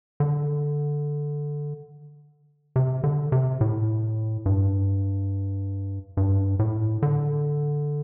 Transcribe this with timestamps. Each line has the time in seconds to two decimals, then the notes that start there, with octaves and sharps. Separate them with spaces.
0.20 D3
2.76 C3
3.04 D3
3.32 C3
3.61 A2
4.46 G2
6.17 G2
6.59 A2
7.02 D3